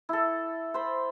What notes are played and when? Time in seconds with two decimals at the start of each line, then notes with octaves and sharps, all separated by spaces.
0.09 E4 A4
0.74 C5 B5